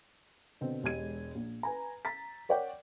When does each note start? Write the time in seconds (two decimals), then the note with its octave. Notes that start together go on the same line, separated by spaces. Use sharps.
0.61 B2 D3 C4
0.83 E1 G#3 G4 G#6 D#7
1.35 A#1
1.63 B4 G#5 A#5
2.05 A#5 A6 B6
2.49 A#4 C#5 D5 F#5 G5